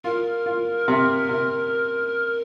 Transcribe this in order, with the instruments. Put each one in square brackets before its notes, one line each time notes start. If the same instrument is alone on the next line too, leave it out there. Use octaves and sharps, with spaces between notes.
[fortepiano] F4 [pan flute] A#4
[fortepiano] F4
C3
C3